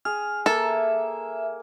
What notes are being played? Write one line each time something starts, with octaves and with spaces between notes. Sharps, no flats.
G#4 F6
A#3 A4 E5